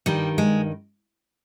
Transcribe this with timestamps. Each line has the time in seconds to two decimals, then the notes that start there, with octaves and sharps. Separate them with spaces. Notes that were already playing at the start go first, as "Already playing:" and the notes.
0.06 G2 D#3 G3
0.38 G#3